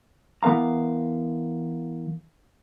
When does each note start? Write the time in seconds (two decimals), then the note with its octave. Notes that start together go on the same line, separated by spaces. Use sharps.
0.43 E3 B3 A#4 F5 A#5